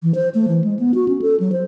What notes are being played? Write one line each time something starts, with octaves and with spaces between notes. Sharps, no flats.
E3
C5
A3
E3
G#3
B3
F#4
C#4
A4
F#3
C5